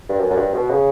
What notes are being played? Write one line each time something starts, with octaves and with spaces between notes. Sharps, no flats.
G2
F#2
F#2
G2
B2
C#3